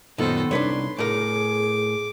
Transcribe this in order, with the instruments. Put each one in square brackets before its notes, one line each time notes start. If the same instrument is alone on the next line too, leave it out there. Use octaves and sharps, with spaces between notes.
[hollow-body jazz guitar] F#2 A#2 [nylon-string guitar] D#3 B3 D#4 [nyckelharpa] A4 C5
[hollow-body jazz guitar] C2 D4 [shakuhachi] D#4 [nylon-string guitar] B4 C#5 [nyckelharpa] C6
[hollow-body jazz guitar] A2 A#4 [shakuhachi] G#4 [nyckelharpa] D6